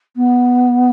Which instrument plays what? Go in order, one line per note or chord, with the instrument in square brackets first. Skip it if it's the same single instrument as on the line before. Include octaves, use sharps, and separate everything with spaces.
[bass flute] B3